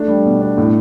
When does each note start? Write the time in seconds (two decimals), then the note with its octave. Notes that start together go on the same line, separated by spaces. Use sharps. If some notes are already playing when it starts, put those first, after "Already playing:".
Already playing: A3 D4
0.08 G3
0.25 B2
0.42 D4
0.58 A2